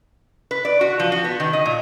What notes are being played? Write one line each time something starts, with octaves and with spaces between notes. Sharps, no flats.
B4
D5
F#4
F3
F#4
B3
D#3
D#5
A#2